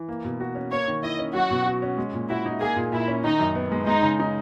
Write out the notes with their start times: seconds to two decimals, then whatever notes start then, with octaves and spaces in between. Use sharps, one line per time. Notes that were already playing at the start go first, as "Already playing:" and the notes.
Already playing: E3
0.09 A#3
0.25 B2
0.40 F#4
0.55 C#4
0.71 A#3 C#5
0.88 D#3
1.03 E4 D#5
1.19 C#4
1.34 F#3 F#4
1.51 B2
1.66 F#4
1.82 C#4
1.97 G#3
2.13 A#2
2.29 E4 F#4
2.46 D#4
2.60 A#3 G#4
2.76 A#2
2.92 A#2 E4
3.08 C#4
3.24 D#3 D#4
3.40 F#2
3.55 B3
3.72 G#3
3.87 G#3 D#4
4.03 C#3
4.20 D#4